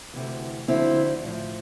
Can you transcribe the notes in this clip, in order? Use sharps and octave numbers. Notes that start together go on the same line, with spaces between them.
D2 C3 E3
D2 D3 F3 C4 E4
A2 F3